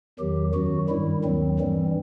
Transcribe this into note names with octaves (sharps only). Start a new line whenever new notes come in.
E2 D#3 F#3 G4
F#2 D#3 F#3 F#4
G2 D#3 G3 E4
D#2 D#3 F#3 C4
G2 E3 G3 C4